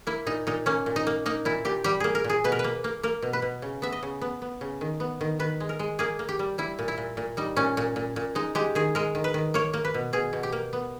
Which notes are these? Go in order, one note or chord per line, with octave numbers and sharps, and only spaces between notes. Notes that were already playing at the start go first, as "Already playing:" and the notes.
A#3 E4
A#2 D#4
A#2 D#4
A#3 C#4
A#2
D#4
A#3
A#3 D#4
A#2 E4
A#2 G4
G3 G4
A#3 G#4
A#4
A#2
G#4
B2 B4
A#4
B4
A#3
A#3
A#3 A#4
B2
B4
B2
C#3
B3 E5
D#5
C#3
B3
B3
C#3
D#3
B3
D#3
D#3 B4
G#3
A#4
G#3
A#3 G#4
A#3
G4
G3
G3 E4
A#2
E4
A#2
A#2
G3 D#4
A#2 C#4
A#2
A#2
A#2
G#3 D#4
G#3 G4
D#3 G#4
G#3 A#4
D#3
B4
D#3
A#3 C#5
A#3
B4
B2
B2 G#4
B2
G4
A#3
B3